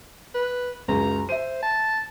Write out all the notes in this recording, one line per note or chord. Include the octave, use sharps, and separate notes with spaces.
B4
C#2 F#2 A#5
C5 E5 D#7
A5